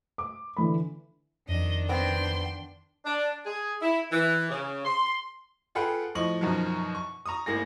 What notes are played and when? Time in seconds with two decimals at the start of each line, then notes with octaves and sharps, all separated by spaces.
0.18 D6
0.57 D3 E3 B5
1.48 F2 D#3 D4 D#5
1.89 B3 C4 G5 C6
3.05 D4
3.46 G#4
3.81 E4
4.11 E3
4.50 C#3
4.85 C6
5.75 F4 G#4 A4 B4 F#5 G5
6.15 A2 F3 D#5 C#6 F#7
6.41 F#2 B2 D#3 F3 F#3
6.95 C#6
7.26 A#5 C#6 D#6
7.46 G#1 A2 A#3 G#4 A#6